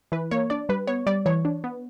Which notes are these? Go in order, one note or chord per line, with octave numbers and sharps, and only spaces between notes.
E3 B4
A#3 C#5
D4 D5
G3 B4
B3 C#5
G3 D5
E3 C#5
D4
B3